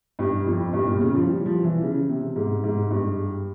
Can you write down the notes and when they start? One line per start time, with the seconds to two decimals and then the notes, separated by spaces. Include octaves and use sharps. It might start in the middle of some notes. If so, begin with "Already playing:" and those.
0.19 G2
0.46 F2
0.73 G2
0.87 A#2
1.01 C#3
1.14 F3
1.28 G3
1.46 F3
1.64 E3
1.82 C#3
2.09 C3
2.36 G#2
2.64 G#2
2.91 G2